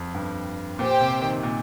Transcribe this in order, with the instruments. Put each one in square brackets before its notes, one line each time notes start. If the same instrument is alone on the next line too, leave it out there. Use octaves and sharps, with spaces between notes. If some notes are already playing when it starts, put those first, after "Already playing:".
Already playing: [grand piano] F2
G2
[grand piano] A#2 [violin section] G4 C5 G5
[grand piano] C3
D#3
A#2